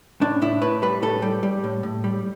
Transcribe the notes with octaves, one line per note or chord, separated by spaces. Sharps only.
A2 D4
A2 E4
A2 B4
G3 B4
A2 A4
G3
G3
A2
A2
G3